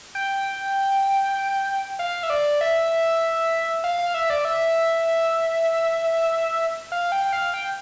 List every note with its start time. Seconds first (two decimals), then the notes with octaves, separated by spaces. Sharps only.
0.15 G5
1.99 F5
2.23 E5
2.30 D5
2.61 E5
3.84 F5
3.99 F5
4.14 E5
4.30 D5
4.45 E5
6.92 F5
7.12 G5
7.33 F5
7.54 G5